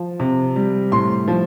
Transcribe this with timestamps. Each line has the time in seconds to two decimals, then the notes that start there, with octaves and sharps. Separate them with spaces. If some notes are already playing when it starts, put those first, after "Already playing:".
Already playing: F3
0.20 C3
0.56 G3
0.92 A2 C6
1.28 F3